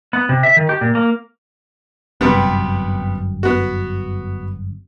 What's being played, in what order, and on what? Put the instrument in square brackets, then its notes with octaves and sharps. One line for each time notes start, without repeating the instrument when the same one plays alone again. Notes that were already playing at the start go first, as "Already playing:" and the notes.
[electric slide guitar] B3
C3
E5
D#3
G4
A#2
A#3
[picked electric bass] G1 F#2 [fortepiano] C3 G3 B3
[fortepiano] B3 F#4